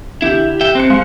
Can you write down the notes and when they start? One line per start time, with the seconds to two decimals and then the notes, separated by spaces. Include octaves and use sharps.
0.22 D3 E4 G4
0.61 E5 G5
0.75 C4 C5 F#6 C#7
0.90 G#3 F5 C6 F#6